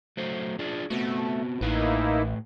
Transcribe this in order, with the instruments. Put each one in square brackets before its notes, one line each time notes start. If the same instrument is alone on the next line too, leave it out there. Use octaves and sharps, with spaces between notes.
[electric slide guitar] F#3 A3 C5
D4 F4 G#4
[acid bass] A3 [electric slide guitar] B3 C4 F#4
[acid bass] A1 [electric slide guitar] A2 B4 F5 [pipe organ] A#3 D#4 E4